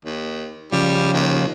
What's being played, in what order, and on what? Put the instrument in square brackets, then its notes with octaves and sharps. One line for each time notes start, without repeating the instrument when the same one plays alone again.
[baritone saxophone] D#2
[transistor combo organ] C#3 F3 [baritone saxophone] G3
[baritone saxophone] D#2